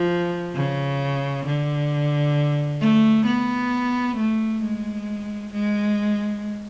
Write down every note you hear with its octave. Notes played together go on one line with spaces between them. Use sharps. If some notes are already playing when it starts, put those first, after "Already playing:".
Already playing: F3
C#3
D3
A3
B3
A3
G#3
G#3